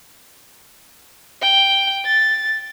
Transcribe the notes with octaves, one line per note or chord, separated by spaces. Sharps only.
G5
A6